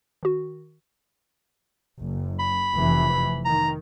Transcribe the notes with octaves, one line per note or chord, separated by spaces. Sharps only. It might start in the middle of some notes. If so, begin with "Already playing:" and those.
D#3 F#4
F#1
B5
F1 E3
D#3 A#5